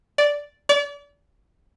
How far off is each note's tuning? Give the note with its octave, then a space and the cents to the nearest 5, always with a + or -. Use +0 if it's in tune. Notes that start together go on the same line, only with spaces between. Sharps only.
D5 -5
D5 -35